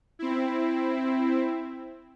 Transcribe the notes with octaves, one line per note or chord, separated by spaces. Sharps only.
C4 E4